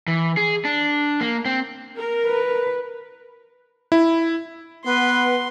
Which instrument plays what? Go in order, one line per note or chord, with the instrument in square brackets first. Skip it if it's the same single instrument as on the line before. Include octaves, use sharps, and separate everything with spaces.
[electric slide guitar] E3
G#4
D4
A#3
C4
[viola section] A#4
[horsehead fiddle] B4
[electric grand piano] E4
[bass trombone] B3 [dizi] B4 [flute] F#5 [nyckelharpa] C6